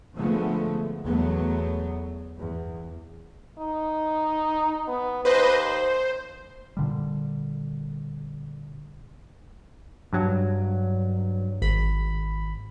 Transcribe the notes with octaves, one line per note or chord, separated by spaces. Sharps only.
D3 F3 G#3 A3 B3
E2 F#3 A3 B3
E2
D#4
B3
D#2 B4 C5 D#5
C5
A#2 D3 G3
G2 F#3
G#1 B5